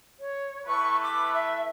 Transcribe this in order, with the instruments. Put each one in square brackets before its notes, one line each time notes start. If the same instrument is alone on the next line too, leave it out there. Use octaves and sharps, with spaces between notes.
[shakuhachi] C#5
[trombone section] E3 A3 B4 [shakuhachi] C#6
[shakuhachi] D6
E5